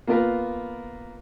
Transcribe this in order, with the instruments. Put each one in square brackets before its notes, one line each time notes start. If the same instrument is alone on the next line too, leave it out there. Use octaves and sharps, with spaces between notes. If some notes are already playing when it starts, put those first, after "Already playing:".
[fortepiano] A#3 B3 F4 A#4 B4